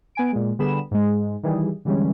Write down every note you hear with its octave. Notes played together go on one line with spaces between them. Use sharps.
B3 G#5 D7
A#2 G#3
D3 G3 B3 G#4 B5 E7
G#2 G#3
D#3 E3 G3 G#4
D3 E3 G3 G#3 C#4